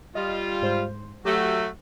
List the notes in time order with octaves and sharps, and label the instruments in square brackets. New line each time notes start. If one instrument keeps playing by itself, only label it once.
[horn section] G3 F4 [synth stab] D#5
[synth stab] G#2 C5
[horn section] F#3 A3 F#4 [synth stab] G4 F#5